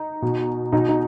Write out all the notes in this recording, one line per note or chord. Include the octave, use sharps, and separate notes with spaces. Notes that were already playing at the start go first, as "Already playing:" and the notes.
Already playing: D#4
B2
B2 D#4
D#4